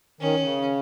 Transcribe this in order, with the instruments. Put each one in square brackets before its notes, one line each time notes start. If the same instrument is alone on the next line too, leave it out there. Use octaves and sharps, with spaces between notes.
[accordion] D#3 [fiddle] C#4
[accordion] C#3